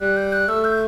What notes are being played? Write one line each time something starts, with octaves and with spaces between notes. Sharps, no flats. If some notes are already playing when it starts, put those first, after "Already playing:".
G3 F#6
G6
F#6
A3 E6
G6